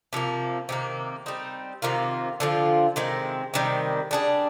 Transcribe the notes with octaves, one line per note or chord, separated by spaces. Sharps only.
C3 F3 A#3
C3 D#3 A#3
G3 C4 D#4
C3 D#3 A#3 F4
D3 F3 C4 F4
C3 D#3 G#3 C4
C3 D#3 G3
G3 D4 G#4